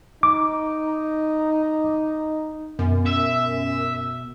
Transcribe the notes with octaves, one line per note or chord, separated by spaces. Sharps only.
D#4 D6
F#2 B2
E5